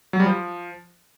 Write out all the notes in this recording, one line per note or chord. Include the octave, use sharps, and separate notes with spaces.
F#3
G3
F3